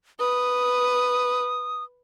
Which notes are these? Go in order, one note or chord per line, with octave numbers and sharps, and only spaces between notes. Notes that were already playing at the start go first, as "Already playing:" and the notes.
B4 D#6